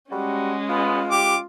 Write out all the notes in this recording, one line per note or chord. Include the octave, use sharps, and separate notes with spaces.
G3 G#3 C#4 F#4
B3 F4
G4 D6